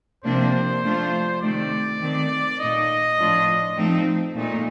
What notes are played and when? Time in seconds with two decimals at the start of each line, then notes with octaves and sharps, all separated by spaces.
0.24 C3 F3 A#3 D4 C5
0.82 F3 A3 D4 F4
1.41 C3 D#3 A3 D5
2.00 D#3 A3 C4
2.59 A#2 A3 D#4 D#5
3.18 A2 F3 A3 D4 F4
3.76 F3 A3 C4 D#4
4.35 A#2 A3 D#4